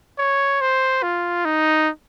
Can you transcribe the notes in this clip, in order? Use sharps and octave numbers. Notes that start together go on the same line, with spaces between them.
C#5
C5
F4
D#4